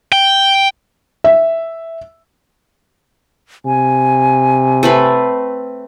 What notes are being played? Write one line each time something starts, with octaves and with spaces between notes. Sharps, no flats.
G5
E5
C3 G#5
A3 C4 B4